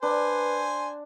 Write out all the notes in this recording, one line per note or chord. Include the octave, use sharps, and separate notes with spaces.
D4 B4 C5 G#5